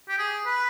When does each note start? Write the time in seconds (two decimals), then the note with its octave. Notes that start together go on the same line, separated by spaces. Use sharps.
0.09 G4
0.18 G#4
0.46 B4